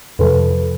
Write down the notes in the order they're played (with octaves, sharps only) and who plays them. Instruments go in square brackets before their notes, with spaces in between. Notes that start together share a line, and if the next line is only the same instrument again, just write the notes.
[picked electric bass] F2 C3 F3 [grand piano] A4 B4